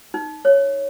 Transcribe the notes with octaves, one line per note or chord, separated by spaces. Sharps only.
D#4
C#5